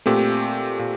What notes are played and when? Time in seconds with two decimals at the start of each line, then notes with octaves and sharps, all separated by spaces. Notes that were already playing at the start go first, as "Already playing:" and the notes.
0.06 A#2 A3 C4 G4
0.79 A#2